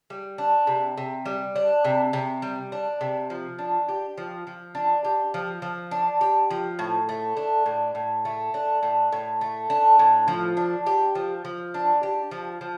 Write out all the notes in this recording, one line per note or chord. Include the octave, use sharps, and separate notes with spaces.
G3
D4
C3
C3
G3
D4
C3
C3
G3
D4
C3
F3
D4
G4
F3
F3
D4
G4
F3
F3
D4
G4
F3
A2
A3
D4
A2
A2
A3
D4
A2
A2
A3
D4
A2
F3
D4
G4
F3
F3
D4
G4
F3
F3